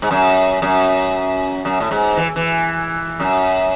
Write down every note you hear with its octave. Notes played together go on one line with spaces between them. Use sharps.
G#2
F#2
F#2
F#2
A2
G#2
E3
E3
F#2